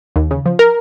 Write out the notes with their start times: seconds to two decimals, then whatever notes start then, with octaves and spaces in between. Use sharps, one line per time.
0.16 D#2
0.31 C#3
0.46 F3
0.59 A#4